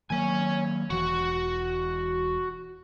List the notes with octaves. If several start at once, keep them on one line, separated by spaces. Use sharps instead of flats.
D#3 F#3 A#3 C#5 G#5
E1 E3 F#4